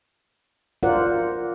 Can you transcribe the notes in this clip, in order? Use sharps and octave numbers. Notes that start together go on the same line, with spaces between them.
F4 A#4 C5 D5 F#5